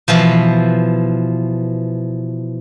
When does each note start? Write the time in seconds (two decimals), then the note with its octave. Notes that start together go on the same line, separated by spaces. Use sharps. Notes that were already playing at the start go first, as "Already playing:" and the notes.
0.08 B2 E3 F3